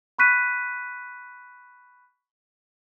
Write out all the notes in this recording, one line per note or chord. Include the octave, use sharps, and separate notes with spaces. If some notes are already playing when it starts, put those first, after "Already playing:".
B5 C#6 F#6 B6 D#7